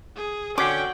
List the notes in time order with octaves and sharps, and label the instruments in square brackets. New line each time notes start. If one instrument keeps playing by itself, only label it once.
[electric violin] G#4
[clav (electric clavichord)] D3 C#4 [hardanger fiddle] F#4 [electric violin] G5 [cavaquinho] D6